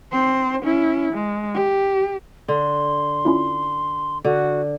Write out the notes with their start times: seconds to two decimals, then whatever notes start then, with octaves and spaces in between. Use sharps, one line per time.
0.12 C4 C5
0.63 C#4 E4
1.13 G#3
1.54 G4
2.48 D3 C6
3.25 C#4 E4 F4
4.25 D3 F#4